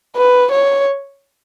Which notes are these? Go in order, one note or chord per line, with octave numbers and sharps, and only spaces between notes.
B4
C#5